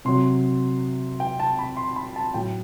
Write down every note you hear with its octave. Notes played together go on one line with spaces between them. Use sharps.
C3 F#3 C6
G5
A5
B5
C6
B5
A5
A2 F#3 G5